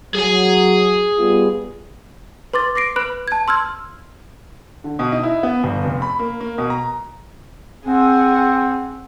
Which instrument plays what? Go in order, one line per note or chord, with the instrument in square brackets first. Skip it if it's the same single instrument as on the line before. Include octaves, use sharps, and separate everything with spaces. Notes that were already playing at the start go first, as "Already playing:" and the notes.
[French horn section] F#3 [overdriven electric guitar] G#4 G#5
[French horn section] G3 B3 F4
[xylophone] B4 C6 D6 A6
D6 A#6 C7 D7
B4 B5 F#6 D7
A5 G#6
C6 E6 F6 G#6
[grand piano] D3
B2
D#4
E4
B3
G1
F1
B5
A#3
A#3
B2
A#5
[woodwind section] C4 [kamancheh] G#4 F#5